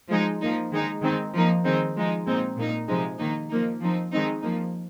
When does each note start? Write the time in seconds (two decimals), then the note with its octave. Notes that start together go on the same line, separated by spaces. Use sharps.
0.09 F3 G#3 D#4
0.41 F3 A#3 D#4
0.72 D#3 G#3 D#4
1.02 D#3 G#3 C4 D#4
1.33 F3 A#3 D#4
1.64 D#3 G#3 C4 D#4
1.95 F3 G#3 D#4
2.26 A#2 G#3 C4 D#4
2.57 A#2 A#3 D#4
2.88 C3 F3 G#3 D#4
3.18 D#3 A#3 D#4
3.50 F3 A#3 D#4
3.81 F3 C4 D#4
4.12 D#3 G#3 C4 D#4
4.42 F3 A#3 D#4